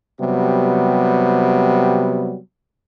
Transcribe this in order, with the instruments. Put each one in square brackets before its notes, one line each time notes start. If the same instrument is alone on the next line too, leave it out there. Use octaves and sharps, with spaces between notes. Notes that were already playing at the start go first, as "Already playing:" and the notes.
[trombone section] C3 F#3 G3 B3